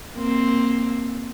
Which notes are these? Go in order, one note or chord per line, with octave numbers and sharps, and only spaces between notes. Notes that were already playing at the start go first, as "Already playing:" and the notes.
A#3 C4